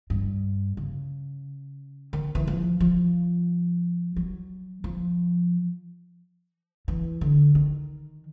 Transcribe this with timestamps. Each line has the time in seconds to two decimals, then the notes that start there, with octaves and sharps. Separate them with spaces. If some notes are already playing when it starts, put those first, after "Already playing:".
0.10 G2
0.77 C#3
2.13 D#3
2.35 E3
2.47 F3
2.80 F3
4.16 F#3
4.84 F3
6.88 E3
7.21 D3
7.55 D#3